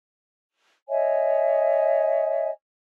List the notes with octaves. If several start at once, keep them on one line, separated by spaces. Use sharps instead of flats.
C#5 D#5 E5 G#5